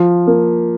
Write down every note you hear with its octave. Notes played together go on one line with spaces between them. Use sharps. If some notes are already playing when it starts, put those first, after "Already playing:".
Already playing: F3
A#3